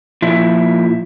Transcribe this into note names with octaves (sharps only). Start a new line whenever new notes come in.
A#2 F3 E4